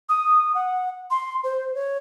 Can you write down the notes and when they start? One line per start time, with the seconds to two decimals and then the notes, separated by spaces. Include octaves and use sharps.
0.09 D#6
0.55 F#5
1.11 C6
1.44 C5
1.75 C#5